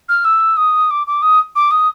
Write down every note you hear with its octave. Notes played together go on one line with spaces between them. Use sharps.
F6
E6
D#6
D6
D6
D#6
D6
D#6